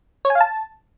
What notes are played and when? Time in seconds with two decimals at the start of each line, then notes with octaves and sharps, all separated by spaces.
0.25 C#5
0.30 G#5
0.35 F5
0.41 A5